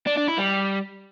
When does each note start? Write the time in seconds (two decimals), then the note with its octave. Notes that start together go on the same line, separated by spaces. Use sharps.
0.06 D4
0.17 D4
0.28 E4
0.38 G3